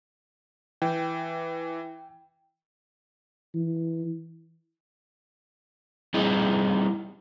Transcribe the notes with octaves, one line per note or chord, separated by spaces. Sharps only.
E3 G5
E3
G3 C4 D#4 E4 G#4